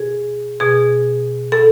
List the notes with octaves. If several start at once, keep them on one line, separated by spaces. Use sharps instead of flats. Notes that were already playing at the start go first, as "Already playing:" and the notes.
Already playing: B2 G#4
B2 G#4
A4